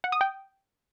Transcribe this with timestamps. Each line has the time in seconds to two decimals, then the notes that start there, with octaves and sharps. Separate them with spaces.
0.04 F#5
0.12 D#6
0.21 G5